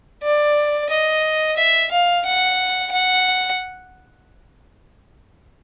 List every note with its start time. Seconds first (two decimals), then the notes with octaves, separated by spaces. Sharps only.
0.23 D5
0.90 D#5
1.57 E5
1.91 F5
2.25 F#5
2.92 F#5